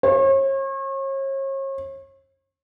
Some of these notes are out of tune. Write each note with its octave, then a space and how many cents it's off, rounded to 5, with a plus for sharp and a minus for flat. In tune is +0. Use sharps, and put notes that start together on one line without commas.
C#5 -40